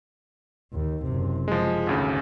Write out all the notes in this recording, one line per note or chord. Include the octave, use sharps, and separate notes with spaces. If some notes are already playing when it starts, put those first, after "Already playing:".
D#2
F#1 C3
F3 G#3
G#1 D2 C#3